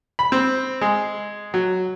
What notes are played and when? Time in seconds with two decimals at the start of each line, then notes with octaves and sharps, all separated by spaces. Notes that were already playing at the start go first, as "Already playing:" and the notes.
0.19 B5
0.32 C4
0.81 G#3
1.54 F#3